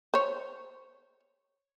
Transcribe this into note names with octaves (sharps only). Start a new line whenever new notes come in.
C5 C#5